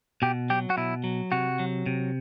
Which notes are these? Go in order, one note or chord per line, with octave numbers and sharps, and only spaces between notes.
B2 G4
F#3 G4
F#4
B2 E4
F#3
C3 F#4
F#3
C3